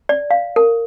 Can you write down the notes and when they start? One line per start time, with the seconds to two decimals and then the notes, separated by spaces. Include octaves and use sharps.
0.09 D5
0.31 F5
0.56 A#4